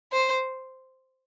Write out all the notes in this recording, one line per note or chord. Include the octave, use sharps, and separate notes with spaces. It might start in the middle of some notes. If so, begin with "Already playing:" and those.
C5